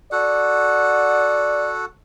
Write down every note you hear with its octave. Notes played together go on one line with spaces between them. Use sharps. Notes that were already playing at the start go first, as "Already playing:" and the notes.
F#4 A4 D5 F#5